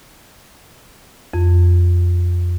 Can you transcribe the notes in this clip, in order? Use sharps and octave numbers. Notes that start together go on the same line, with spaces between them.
F2